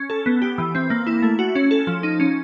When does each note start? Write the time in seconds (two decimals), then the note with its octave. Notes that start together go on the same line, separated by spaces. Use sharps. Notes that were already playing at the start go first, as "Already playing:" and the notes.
Already playing: C#4
0.10 A4
0.26 B3
0.42 G4
0.58 E3
0.75 C4
0.90 A#3
1.07 E4
1.22 A3
1.39 F#4
1.55 C#4
1.71 A4
1.87 F3
2.03 D#4
2.20 C#4